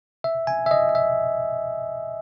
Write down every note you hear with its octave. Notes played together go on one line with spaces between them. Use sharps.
E5
G#5
E5
D#5
D#5
E5